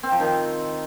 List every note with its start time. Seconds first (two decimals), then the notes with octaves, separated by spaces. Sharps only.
0.03 C4
0.11 F3
0.20 D#3